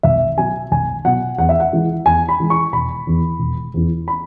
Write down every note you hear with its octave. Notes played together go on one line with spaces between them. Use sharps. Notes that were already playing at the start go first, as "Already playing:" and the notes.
B1 E5
B2 F#3 G#5
B1 G#5
B2 F#3 F#5
E2 F#5
E5
F#5
E3 G#3
E2 G#5
B5
E3 G#3
C#6
E1 B5
E2 E3
E1
E2 E3
B5